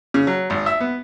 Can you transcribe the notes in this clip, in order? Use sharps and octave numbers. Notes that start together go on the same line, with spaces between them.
C#3
F#3
G#1
E5
B3